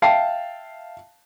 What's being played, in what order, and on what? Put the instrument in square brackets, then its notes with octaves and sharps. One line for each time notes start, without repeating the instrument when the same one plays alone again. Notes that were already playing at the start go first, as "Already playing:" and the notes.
[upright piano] E5 F5 G5 A5 C7